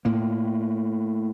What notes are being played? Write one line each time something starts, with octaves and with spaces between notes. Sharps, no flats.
A2 A#3